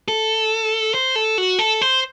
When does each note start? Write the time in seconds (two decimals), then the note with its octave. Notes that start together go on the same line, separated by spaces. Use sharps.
0.08 A4
0.94 C5
1.16 A4
1.38 F#4
1.59 A4
1.81 C5